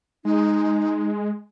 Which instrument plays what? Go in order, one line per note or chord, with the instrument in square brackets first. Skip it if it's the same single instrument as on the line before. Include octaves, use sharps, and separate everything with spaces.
[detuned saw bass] G#3 [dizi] D#4